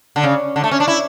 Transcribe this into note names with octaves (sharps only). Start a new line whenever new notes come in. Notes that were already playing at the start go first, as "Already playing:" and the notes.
D3
C#3
D3
A3
C#4
D4
E4